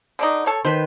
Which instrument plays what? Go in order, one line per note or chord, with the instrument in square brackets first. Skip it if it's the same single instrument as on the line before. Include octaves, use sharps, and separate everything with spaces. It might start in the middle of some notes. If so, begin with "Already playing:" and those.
[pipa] D3 D4 D#4
A4 C#5
[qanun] D#3 B4 [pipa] C5